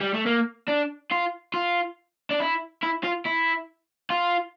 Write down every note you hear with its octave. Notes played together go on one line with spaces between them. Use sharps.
G3
A3
A#3
D4
F4
F4
D4
E4
E4
F4
E4
F4